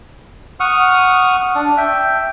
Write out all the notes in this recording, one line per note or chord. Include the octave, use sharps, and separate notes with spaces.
F#5 C#6 D#6 F6
D4
E5 G5